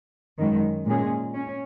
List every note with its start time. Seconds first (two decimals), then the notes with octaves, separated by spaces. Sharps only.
0.38 F#2 D#3 G#3
0.86 A#2 G#3 C#4 G#4
1.35 C#4